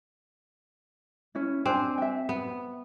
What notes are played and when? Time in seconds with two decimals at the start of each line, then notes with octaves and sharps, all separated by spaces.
1.35 C#4 E4
1.66 C4 D4 C5 G#5
1.98 E5 G5
2.29 B3